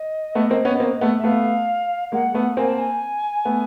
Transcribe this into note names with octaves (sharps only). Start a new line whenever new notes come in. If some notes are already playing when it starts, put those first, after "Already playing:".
Already playing: D#5
A3 B3
A#3 C4
B3 C#4
B3
A#3 C4
A3 B3
E5
A3 B3 F5
G#3 A#3 F#5
A3 B3
A#3 C4 G#5
A5
G#5
A3 B3